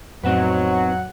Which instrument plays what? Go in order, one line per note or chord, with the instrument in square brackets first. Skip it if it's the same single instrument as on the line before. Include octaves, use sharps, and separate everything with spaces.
[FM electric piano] F2 A2 [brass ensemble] F#3 [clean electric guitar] B3 C4 D#4 [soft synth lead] F#5